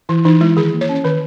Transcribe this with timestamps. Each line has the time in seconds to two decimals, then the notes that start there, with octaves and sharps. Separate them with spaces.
0.09 E3 E4
0.25 E3 D#4
0.41 G#3 E4
0.57 D#3 G#4
0.73 A#3
0.81 C#5
0.89 C#4
0.95 C#5
1.04 D#3 B4